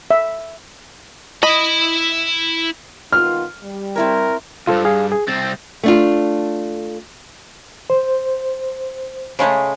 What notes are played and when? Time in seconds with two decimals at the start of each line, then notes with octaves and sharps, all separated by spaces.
0.11 E5
1.43 E4 D#5 B5
3.13 D#3 B3 F4 F6
3.63 G3
3.96 C4 E4 A#4 C#5
4.67 C#2 G2 F4 A4 C5
4.85 G#4 F5
5.12 G#4
5.28 C2 C4 A6
5.83 A3 D4 F4
7.90 C5
9.39 C#3 G#3 A3